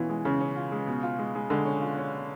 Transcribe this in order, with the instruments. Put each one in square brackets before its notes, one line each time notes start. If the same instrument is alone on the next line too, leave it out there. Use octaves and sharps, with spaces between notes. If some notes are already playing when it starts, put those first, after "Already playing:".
Already playing: [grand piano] B2 C#4 F4 [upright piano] E3
[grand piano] G#3
[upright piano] C#3 [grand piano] C#4
[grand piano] C#4
F4
G#3
B2
F4
G#3
G#3
[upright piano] D3 [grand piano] G#3
[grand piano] C#4
F4
C#4